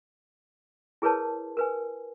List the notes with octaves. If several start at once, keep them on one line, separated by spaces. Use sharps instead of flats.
E4 G#4 A#4 B4 C#5 A5
A#4 B4 G#5